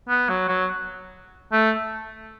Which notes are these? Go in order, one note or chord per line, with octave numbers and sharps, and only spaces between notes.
B3
F#3
F#3
A3